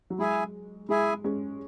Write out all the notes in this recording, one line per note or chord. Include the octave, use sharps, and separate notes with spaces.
F#3
G#3 E4 G#4 E5 G#5
G#3 E4 G#4 E5 G#5
G#3 C#4